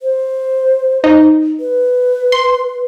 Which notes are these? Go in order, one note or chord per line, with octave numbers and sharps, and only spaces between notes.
C5
D#4
B4
C6